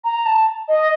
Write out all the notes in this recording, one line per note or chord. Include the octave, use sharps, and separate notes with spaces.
A#5
A5
D#5